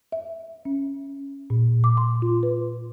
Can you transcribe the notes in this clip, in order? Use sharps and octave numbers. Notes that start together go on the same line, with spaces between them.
E5
C#4
A#2
D6
C6
F4
B4